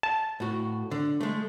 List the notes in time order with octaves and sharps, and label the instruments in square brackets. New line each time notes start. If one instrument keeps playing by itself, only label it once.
[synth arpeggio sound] A5
[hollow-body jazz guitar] A2 F#4
D3
G#3 A3